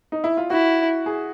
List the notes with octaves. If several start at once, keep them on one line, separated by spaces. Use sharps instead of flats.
D#4
E4
F4
E4 F#4
G#4